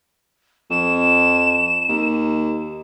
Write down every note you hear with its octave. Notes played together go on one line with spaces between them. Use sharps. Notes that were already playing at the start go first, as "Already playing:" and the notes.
F2 E7
D#2